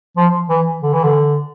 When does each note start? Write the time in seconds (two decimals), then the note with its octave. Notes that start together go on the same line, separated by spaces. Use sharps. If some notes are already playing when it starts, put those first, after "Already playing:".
0.17 F3
0.49 E3
0.82 D3
0.93 E3
1.04 D3